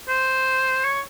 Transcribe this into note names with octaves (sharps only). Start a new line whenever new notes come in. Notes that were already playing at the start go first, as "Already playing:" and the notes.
C5
C#5